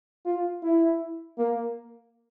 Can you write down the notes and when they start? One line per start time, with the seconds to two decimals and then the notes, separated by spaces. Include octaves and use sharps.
0.26 F4
0.63 E4
1.38 A#3